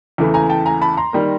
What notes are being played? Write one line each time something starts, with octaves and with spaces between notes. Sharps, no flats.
E2 C#3 E3 A3
G#5 A#5
G5 A5
G#5 A#5
A5 B5
A#5 C6
D#3 G3 A#3